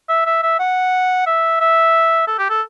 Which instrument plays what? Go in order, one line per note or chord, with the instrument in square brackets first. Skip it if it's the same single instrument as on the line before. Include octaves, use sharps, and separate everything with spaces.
[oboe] E5
E5
E5
F#5
E5
E5
A4
G4
A4